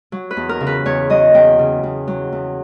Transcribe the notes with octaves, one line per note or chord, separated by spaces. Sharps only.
F#3
B4
E2
A#4
C#3
B4
E2 C#5
F#3 D#5
E2 G5
C#3
E2
F#3
E2